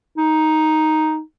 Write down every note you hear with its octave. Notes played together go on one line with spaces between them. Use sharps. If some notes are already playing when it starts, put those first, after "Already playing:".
D#4